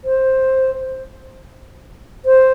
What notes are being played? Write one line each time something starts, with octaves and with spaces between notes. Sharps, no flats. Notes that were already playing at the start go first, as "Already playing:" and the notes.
C5
C5